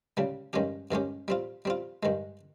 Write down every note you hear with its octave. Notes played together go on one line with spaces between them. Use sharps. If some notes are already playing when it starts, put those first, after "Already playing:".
C#2 C#3 G3
G2 D#3 G#3 C#4 G4
G2 D#3 G#3 C#4 G4
G3 C4 F4
G3 C4 F4
G2 D#3 G#3